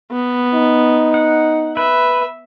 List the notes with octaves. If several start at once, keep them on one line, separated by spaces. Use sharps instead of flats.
B3
D#4
F#5
B4 E5